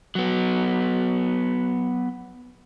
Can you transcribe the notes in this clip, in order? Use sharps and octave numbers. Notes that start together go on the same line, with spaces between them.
F#3 B3